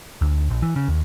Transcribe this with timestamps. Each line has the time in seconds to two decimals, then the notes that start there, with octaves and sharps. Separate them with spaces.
0.21 D2
0.50 A#1
0.62 E3
0.76 C#3
0.88 D#2